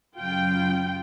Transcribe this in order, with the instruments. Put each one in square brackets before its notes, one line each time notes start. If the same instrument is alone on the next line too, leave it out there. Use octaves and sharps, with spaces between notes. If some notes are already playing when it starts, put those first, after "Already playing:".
[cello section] F#2 C#3 F#3 [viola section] F4 G5